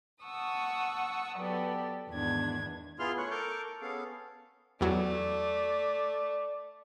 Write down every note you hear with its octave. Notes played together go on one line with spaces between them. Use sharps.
F#5 A5 C#6 D#6 E6
F#3 B3 G4 A4 D5
E2 G#2 D#3 B3 D4 G#6
B3 E4 F4 G#4 C6 F6
A3 E4 C#5 C#6 F#6
A4 A#4 C#6 D6 F6 G6
B3 C#4 G#4 A4 F5
E2 F#3 A3 D5